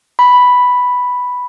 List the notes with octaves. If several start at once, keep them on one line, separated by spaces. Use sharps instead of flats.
B5